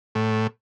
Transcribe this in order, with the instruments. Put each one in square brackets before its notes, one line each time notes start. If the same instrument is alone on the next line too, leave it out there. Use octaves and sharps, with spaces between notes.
[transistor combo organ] A2